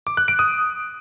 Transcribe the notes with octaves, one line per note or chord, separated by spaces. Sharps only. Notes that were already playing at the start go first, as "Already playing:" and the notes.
D6
F#6
D7
D#6